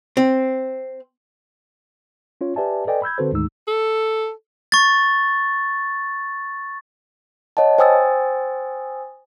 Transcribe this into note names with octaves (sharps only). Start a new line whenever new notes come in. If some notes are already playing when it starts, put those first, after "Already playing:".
C4
C#4 F4 C#5
G4 B4 D5 E5 G#5 A5
A4 B4 D5 D#5 G5 G#5
B5 E6 G6 G#6
D3 C4 F#4 A4 B4 C5
D2 G#2 D#3 G#3 D#4 E6
A4
C#6 A6
C#5 D#5 F#5 A5
C5 G5 G#5 D#6 E6 A6